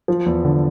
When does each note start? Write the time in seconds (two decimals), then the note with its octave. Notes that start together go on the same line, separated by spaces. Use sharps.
0.08 F3
0.26 E2
0.45 D3